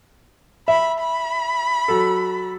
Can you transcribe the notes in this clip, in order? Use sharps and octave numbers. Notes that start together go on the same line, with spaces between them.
E5 B5
B5
F#3 A4